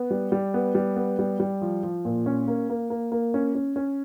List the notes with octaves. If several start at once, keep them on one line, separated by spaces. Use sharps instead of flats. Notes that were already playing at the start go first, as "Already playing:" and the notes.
Already playing: B3
G3
G3
B3
G3
B3
G3
G3
F3
F3
A#2
C#4
A#3
A#3
A#3
A#3
C#4
C#4
C#4